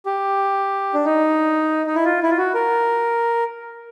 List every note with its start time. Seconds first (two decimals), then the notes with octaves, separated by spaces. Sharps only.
0.06 G4
0.94 D4
1.05 D#4
1.86 D#4
1.95 E4
2.05 F4
2.23 E4
2.30 F4
2.37 F#4
2.54 A#4